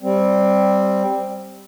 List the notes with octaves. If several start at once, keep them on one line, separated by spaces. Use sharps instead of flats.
G3 C4